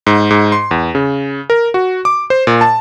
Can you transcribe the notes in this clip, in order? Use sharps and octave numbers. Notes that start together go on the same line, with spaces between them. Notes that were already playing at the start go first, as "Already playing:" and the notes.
G#2
G#2
C6
E2
C#3
A#4
F#4
D6
C5
A#2
A5